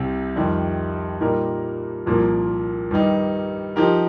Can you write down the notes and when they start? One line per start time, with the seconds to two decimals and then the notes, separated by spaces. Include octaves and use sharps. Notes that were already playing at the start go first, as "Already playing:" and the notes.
Already playing: C2 C3 G3 C4
0.36 F2 D#3 G3
1.21 A#2 G3 D#4 A#4
2.06 C2 A#2 F3 A#3
2.91 G2 D#3 G3 D#4
3.76 F3 D#4 G4 A#4